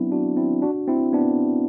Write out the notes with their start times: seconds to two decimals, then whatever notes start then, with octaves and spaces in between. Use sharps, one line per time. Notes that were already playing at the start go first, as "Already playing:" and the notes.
Already playing: F#3 B3 C4 D4 E4
0.12 D4 F#4
0.37 C4 E4
0.62 D4 F#4
0.88 C4 E4
1.13 B3 D4